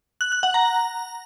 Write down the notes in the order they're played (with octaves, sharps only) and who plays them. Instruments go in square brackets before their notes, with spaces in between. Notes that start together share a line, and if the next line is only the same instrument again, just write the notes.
[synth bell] F#6
F#6
F#5
A#5